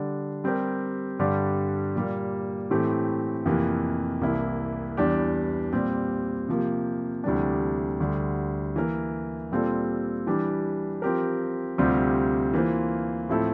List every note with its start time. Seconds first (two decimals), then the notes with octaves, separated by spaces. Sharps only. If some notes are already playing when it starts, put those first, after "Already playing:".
Already playing: D3 G3 D4
0.44 G3 C4 G4 A#4
1.19 G2 D3 G3 D4 G4
1.95 A#2 G3 A#3
2.71 A2 E3 A3 C4 G4
3.46 F2 C3 E3 A#3
4.21 C2 C3 E3 A#3 E4
4.97 E2 E3 G3 D4 G4
5.73 A#2 G3 C4
6.49 C3 F3 A#3
7.24 D2 C3 E3 G3 D4
8.00 D2 D3 G3
8.76 E3 A#3 E4 A#4
9.51 A#2 G3 C4 F4 A4
10.27 E3 G3 D4 G4
11.02 F3 C4 G4 A#4
11.78 D2 C3 G3 C4 F4
12.54 E3 A#3 F4 C5
13.29 A2 F3 C4 E4 A4